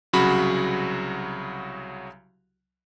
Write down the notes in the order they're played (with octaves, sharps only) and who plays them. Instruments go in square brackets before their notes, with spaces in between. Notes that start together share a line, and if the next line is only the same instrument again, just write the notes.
[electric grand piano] C2 C#3 F#3 F#4 B5